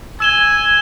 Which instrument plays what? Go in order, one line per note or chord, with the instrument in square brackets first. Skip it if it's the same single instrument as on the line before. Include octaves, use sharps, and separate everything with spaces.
[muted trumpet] G#5 [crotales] E6 E7 G7